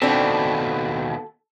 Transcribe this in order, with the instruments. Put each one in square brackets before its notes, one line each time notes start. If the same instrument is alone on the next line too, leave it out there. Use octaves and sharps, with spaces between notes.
[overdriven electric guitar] D#2 B2 [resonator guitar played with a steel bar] C4 D4 [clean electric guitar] A4